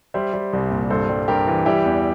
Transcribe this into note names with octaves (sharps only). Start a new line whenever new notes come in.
G3 C5 E5
G3
C2
A#2
G2 A4 C5
G3
G2 G4 A#4
E3
G3 E4 G4
E2